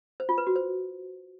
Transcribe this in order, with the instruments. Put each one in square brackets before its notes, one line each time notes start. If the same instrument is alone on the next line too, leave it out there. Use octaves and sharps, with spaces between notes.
[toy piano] C5
F4
B4
F#4
C5